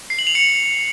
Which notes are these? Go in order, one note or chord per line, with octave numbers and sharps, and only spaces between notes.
C7
F#7
F7
C#7